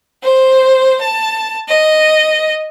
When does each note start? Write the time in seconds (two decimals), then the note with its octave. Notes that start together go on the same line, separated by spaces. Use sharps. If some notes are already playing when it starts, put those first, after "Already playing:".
0.22 C5
1.00 A5
1.68 D#5